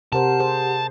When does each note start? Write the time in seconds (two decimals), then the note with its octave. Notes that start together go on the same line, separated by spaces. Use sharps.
0.12 C3 G4 A#4 C5 F#5 A5
0.40 G#4 C5